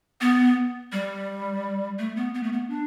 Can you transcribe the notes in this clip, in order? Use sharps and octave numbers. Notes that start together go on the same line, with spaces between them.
B3
G3
A3
B3
B3
A3
B3
D4